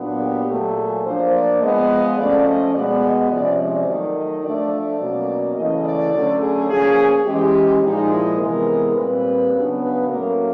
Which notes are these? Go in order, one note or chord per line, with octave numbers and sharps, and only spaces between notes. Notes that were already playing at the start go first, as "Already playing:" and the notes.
Already playing: A#2 F#3 B3 D4
G4
A#2 F#3 A3
G#4
F3 A#3 D4 C5
D5
F3 G#3 B3 D#5
F3 A3 C#4 D5
D#5
B2 G#3 B3 D5
D#5
C3 F3 G#3 C#4 D5
D5
D#3 F#3 A3
D#5
F3 A3 D4 D5
D5
B2 F#3 A#3 C#4
C#3 E3 A3 C#4 D#5
D5
D3 F#3 A3 C#4
G#4
F3 A#3 C#4 G#4
E3 G#3 C#4 G4
A#2 F3 G#3 D#4
E4
C3 E3 G#3 B3 A#4
A#2 G3 C4 B4
C#3 F#3 B3 D4
B4
A2 F#3 A#3 C#4 A#4